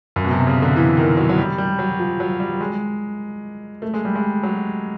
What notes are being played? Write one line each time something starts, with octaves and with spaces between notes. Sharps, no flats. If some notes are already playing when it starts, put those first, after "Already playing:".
F#2
B2
C3
C#3
D3
E3
D#3
F#3
F#3
G3
G3
F#3
F3
F#3
G3
G#3
A3
G#3
G3
G#3
F#3